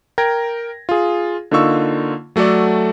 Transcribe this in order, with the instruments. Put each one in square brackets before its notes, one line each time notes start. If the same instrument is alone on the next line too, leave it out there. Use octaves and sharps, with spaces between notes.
[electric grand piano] A#4 G5 G#6 A#6
F4 G#4
D3 A#3 D#4 F4 C#6 E6
F#3 A3 F#4 A4 D5